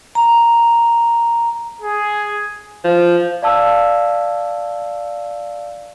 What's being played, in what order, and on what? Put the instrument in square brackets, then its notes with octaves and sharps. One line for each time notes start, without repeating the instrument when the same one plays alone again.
[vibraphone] A#5
[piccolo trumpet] G#4
[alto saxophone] F3
[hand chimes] D5 F5 A5 E6